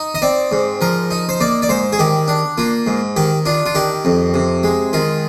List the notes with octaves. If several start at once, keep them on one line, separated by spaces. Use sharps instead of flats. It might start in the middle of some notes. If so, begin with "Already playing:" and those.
Already playing: D#4
D#5
C4 D5
G#2
F3 A#4
D#4
C5
A#3 D5
D5
G#2 C5
G#4
D#3 G4
D4
A#3 F4
G#2
D#3 G4
D4 F4
F4
D#3 G4
F2
C3
G#3
D#3 F4